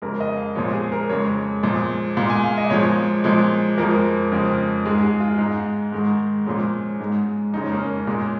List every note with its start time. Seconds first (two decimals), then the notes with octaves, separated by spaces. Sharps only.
0.02 F2 C#3 G#3 A#4
0.20 D#5
0.37 F5
0.55 A#2 F3 G#3 C#5
0.73 G#4
0.92 A#4
1.09 F2 C#3 G#3 C#5
1.63 A#2 F3 G#3
2.17 A#2 G#3 F5
2.30 G#5
2.44 F5
2.58 D#5
2.70 A#2 F3 G#3 C#5
3.24 A#2 F3 G#3
3.78 F2 F3 G#3 A#4
4.32 F2 C#3 F3 G#3
4.85 G#2 G#3 G#4
5.02 G#4
5.20 F4
5.38 G#2 G#3 D#4
5.92 G#2 D#3 G#3
6.46 A#2 F3 G#3 C#4
6.99 G#2 G#3
7.53 F2 C#3 G#3 D#4
7.62 C#4
7.72 A#3
7.80 C#4
8.07 A#2 G#3